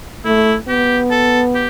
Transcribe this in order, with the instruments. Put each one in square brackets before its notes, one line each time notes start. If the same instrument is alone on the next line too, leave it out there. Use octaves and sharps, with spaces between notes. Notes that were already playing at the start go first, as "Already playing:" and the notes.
[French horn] A3 [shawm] E4
[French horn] B3 [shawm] G4
[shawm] A4
G4